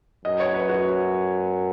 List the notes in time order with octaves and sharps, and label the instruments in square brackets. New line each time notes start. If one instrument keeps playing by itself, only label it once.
[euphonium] F#2 [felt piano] D#5
[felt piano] C#5
B4
F#4